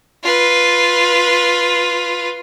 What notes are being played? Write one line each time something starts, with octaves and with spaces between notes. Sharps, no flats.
F4 B4